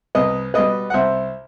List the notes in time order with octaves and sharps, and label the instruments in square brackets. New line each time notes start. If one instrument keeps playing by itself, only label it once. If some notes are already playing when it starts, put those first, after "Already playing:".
[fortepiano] C2 B4 D#5
B2 G3 B4 D#5
F#5
C2 C5 E5